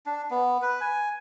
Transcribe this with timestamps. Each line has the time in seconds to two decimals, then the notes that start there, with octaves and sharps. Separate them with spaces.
0.06 D4
0.31 B3
0.62 B4
0.81 G#5